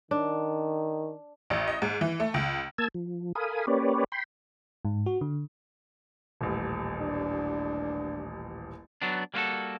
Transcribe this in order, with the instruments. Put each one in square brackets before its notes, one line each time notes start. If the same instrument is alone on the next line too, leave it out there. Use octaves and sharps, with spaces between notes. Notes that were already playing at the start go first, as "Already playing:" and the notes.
[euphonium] D#3 [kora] D4
[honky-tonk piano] A1
D#5
G#2
E3
A3
C#2
[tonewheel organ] A#3 A5 E6 G#6
F3
A4 A#4 F5 G#5 B5 D#6
A#3 C#4 G4 B4 C#5 D5
G5 B5 C6
[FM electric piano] G#2
F#4
D3
[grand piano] D#1 A1
[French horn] D4
[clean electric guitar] F#3 B3 D4
G3 A#3 C4 F4 F#4 A4